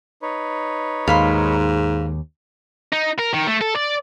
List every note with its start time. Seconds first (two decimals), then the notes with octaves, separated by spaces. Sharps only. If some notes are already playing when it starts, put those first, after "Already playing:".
0.22 D#4 B4 C#5
1.08 D#2 G#2 F5 B5 C6
2.92 D#4
3.19 A#4
3.33 D#3
3.47 A3
3.61 A4
3.75 D5